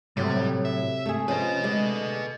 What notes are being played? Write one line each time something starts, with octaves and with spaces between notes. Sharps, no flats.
A2 C3 F#3 G3 A3
E5
A3 G#4
F3 C#4 F4 B4 D#5
D3 G#3 A3